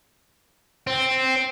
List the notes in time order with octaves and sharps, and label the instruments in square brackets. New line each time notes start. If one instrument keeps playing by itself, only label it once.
[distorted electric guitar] C4